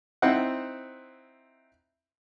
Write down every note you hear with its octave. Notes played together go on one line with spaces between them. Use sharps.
C4 D#4 E4 C5 F#5